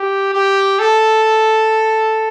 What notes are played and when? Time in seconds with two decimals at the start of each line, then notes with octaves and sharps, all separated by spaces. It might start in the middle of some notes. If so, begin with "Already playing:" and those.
Already playing: G4
0.34 G4
0.79 A4